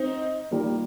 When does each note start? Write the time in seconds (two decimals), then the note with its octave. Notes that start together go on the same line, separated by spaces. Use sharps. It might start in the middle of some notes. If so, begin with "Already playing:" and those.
Already playing: C4 D#4
0.51 D#3 G3 A#3 F4 A#4